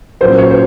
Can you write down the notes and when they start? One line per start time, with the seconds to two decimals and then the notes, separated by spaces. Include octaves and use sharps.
0.21 A#2 F#3 C#4 C5
0.38 C#5
0.51 C5